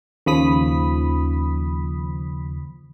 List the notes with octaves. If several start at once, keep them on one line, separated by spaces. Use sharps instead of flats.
D#2 C#3 F3 B5 D#6 B6